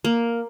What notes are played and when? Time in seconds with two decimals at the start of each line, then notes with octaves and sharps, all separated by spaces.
0.04 A#3